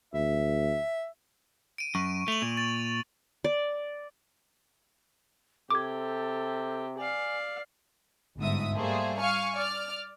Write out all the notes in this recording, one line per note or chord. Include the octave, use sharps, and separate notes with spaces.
D2 E5
D7 D#7
F#2 C#6
A3 F7 F#7
A#2
A6
D5
C3 G4 A4 D6 G#6
D5 F5 G#5
G1 G#2 E5 D#6
G3 A3 A#3 G#4 C5
F5 G#5 C#6 F6
D5 F6